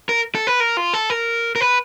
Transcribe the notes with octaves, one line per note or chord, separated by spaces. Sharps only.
A#4
A4
B4
A#4
F4
A4
A#4
A#4
B4